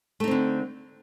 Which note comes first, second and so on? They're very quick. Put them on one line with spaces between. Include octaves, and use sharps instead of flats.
A3 D#4 C4 D3